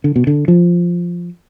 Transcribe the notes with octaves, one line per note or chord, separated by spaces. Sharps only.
D3
B2
D3
F3